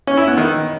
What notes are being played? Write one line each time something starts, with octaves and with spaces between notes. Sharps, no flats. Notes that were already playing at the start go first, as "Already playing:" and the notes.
C#4
E4
B3
D#3